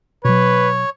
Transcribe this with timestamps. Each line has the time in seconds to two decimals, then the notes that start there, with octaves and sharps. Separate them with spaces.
0.25 B2 F#3 B4 C#5